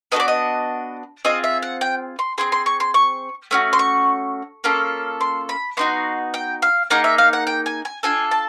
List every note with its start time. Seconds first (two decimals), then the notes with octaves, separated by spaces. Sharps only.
0.12 B3 D4 F#4 A4 D#5
0.20 D5
0.28 D#5
1.25 C4 F4 G#4 D#5
1.44 E5
1.63 F#5
1.81 G5
2.19 C6
2.38 C4 E4 G#4 C6
2.52 C6
2.66 C#6
2.80 C6
2.94 C#6
3.51 A3 C#4 F#4
3.73 C6
3.79 C#6
4.64 A#3 C#4 F4 A4
5.21 C6
5.49 B5
5.77 B3 D#4 F#4 C6
6.34 G5
6.62 F5
6.90 A#3 D#4 G#4 F#5
7.04 E5
7.18 F5
7.33 F#5
7.47 G5
7.66 G#5
7.85 G#5
8.03 D4 F4 A4 G#5
8.31 A5